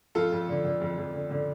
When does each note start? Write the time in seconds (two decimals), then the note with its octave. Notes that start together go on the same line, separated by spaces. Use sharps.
0.15 F2 F4 A4
0.32 F2
0.49 D3
0.65 D3
0.81 F2
0.98 F2
1.14 D3
1.31 D3